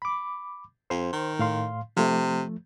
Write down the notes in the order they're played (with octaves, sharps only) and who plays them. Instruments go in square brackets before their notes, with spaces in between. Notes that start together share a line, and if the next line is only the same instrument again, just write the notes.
[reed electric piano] B5 D6
[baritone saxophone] F2 [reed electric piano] C5 C6
[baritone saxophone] D#3
[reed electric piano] A2 F5 C6
[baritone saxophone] C3 [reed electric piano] F3 A3